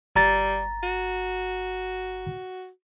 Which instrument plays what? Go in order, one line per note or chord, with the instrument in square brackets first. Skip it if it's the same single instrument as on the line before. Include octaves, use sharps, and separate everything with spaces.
[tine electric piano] G1 A#5 A6 [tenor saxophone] G3
[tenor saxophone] F#4